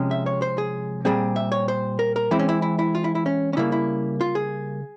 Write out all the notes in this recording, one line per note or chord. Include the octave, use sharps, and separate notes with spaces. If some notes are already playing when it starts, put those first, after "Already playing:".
Already playing: C3 F3 G#3 C#4
E5
C#5
C5
G#4
A#2 G3 C4 G#4
E5
C#5
C5
A#4
A#4
E3 G#3 C4 E4
C#4
E4
E4
E4
F4
E4
E4
C#4
C#4
C#3 G3 A#3 E4
E4
F4
G#4